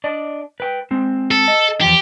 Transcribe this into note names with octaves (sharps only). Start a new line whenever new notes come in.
D4 D5 D#5
B4 G5
G#3 C4
A4
D#5
E2 G#2 F3 G4